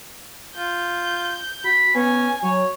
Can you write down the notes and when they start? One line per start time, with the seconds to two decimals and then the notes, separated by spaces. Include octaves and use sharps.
0.57 F4 G6
1.64 F#4 B5
1.95 B3 C#4 G#5
2.43 F#3 C#5